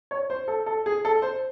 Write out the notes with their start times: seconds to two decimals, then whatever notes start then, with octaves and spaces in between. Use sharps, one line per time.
0.11 C#5
0.30 C5
0.48 A4
0.66 A4
0.86 G#4
1.05 A4
1.22 C5